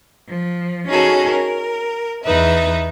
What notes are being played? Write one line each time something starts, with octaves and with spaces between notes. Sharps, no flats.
F3
C#4 D#4 F#4 G#4 A4
A#4
E2 D#4 B4 E5